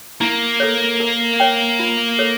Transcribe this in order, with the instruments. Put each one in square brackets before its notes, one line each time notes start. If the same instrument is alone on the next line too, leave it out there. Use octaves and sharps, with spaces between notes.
[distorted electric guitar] A#3 [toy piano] E4
[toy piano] A4 C#5
A#4
C#5 G5
F4
A4 C#5